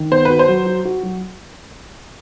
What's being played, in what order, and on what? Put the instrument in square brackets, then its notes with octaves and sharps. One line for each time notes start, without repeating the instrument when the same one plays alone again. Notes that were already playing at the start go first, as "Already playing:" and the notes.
Already playing: [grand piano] D#3
[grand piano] B3 [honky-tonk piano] C5
[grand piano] F#4 [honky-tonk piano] B4
[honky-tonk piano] C5
[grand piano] F#3
F#4
F#4
F#3